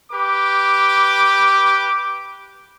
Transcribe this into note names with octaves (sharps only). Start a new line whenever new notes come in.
G4 B4 D6